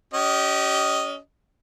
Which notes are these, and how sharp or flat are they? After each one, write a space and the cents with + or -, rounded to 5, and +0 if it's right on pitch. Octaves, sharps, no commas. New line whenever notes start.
C#4 +30 G4 -30 D#5 +0